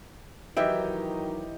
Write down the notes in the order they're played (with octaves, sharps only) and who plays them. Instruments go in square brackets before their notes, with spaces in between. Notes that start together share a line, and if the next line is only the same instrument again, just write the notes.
[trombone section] D#3 F#3 [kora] E3 E5 G5 [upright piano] D#4 G4